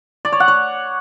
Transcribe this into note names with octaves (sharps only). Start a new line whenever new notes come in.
D5
C#5
F#5
C#5